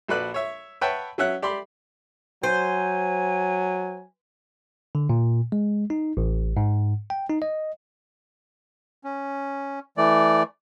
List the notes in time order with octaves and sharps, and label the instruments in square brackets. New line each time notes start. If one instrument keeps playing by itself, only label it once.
[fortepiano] A#1 F#4 A4 B4 D5 F#6
C#5 E5
B4 C#5 E5 F#5 G5 A5
F#3 C#4 E5 F#5 F#6
G4 D5 B5 C6
[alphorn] F#3 [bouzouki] C5 [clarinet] G#5
[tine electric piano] D3
A#2
G#3
D#4
A1
G#2
G5
D#4
D#5
[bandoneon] C#4
E3 A3 D5